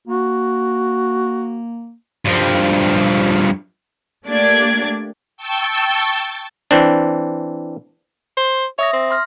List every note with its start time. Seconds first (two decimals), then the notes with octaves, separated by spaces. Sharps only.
0.07 A#3 F#4
2.25 G2 F3
4.26 A3 A#3 D4 G4 D5 G#6
5.37 G5 A5 C#6 E6 G6 A6
6.71 E3 C4 D4
8.37 C5
8.79 C#5 E5 D#6 A#6
8.93 C4
9.11 C6 F6 A#6